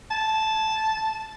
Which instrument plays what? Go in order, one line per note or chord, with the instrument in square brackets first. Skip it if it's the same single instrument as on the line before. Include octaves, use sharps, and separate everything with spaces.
[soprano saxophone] A5